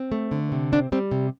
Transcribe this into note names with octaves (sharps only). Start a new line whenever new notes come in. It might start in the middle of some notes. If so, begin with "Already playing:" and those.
Already playing: C4
A3
D3
C3
C4 D4
G3 C4
C3